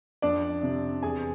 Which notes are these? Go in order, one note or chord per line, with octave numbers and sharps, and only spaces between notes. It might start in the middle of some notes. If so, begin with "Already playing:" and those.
F2 D4 D5
C3
E2 G#4 G#5